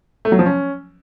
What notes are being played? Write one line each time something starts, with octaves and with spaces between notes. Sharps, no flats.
A3
F#3
F3
C#4